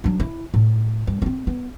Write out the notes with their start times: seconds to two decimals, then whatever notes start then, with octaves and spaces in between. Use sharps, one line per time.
0.04 F#3 D4
0.20 E4
0.54 A2
1.07 G2
1.22 C4 C#4
1.47 B3